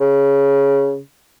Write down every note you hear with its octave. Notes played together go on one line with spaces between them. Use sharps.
C#3